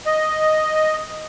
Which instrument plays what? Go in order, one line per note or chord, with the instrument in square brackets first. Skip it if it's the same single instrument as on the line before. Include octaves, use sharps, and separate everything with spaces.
[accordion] D#5